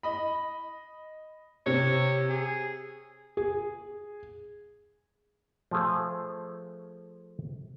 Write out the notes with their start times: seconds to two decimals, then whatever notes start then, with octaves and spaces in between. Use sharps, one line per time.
0.03 D#5 B5
1.66 C3 C#5
2.30 G#4
3.37 G#4
5.71 F3 A3 G#4